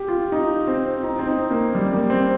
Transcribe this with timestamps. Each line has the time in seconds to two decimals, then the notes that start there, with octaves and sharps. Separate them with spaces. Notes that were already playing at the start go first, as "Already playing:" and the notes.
Already playing: G4
0.08 F4
0.32 D#4
0.67 C4
1.03 D#4
1.19 C4
1.27 D#4
1.51 A#3
1.75 G3
1.93 A#3
2.10 C4